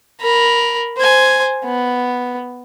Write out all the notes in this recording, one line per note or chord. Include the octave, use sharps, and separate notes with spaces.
A#4 B5
C5 G#5
B3